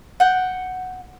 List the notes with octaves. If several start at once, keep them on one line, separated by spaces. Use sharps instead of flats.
F#5 G5